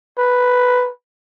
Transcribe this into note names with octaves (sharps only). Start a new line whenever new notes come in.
B4